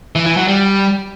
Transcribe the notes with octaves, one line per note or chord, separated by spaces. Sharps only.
E3
E3
F#3
G3